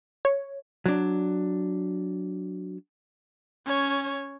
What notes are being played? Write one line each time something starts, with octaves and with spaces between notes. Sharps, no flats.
C#5
F#3 D4
C#4 C#5